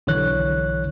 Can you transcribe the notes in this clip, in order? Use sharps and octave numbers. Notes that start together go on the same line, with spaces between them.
B1 D3 E3 C#5 F#6